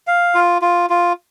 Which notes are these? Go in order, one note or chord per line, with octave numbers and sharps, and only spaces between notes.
F5
F4
F4
F4